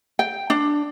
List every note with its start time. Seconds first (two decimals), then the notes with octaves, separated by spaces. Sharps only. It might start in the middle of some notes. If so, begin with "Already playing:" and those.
0.19 G5
0.50 D4